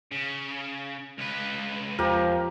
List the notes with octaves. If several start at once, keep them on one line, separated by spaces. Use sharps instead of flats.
C#3
C#2 B4
E2 F3 G4 A#4